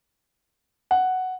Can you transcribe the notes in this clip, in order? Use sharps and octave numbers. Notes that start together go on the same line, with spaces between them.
F#5